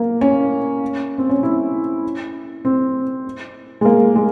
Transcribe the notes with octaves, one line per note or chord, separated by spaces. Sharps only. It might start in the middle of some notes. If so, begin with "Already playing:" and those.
Already playing: A#3
C#4
C4
C#4
E4
C4
G#3
A#3
G#3